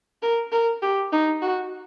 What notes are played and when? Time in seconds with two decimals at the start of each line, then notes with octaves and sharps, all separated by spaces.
0.22 A#4
0.52 A#4
0.82 G4
1.12 D#4
1.42 F#4